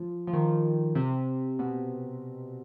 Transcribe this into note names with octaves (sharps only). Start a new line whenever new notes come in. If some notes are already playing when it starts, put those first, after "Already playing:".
Already playing: F3
F3
D#3
C3
B2